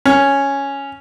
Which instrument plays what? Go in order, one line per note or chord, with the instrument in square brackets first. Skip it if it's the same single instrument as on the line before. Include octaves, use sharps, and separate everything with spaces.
[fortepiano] C#4